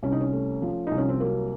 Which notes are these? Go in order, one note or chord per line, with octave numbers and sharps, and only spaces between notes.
C2 C#4
D#4
C#4
A3
F3
C2 D#4
C#4
C4
F#3 A#3